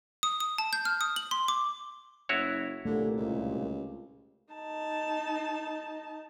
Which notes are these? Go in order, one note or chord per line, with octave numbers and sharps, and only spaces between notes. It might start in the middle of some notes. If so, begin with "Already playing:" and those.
D#6
D#6
A5
G6
F6
D#6
F#7
C6
D6
F#1 E4 F#4 C#5
C2 A#2 D3 A3
C#2
D#4 A5